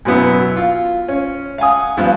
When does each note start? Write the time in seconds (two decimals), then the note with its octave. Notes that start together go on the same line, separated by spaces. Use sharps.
0.05 F#2 B2 F#3 B3 E4
0.56 F4
1.08 C#4
1.58 F5 F#5 G#5 D#6
1.97 G2 F3 B3